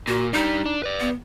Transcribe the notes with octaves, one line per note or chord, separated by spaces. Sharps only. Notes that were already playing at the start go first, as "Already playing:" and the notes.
A#2 F#4
G3 D4 D#4
D4
B4 D5
B3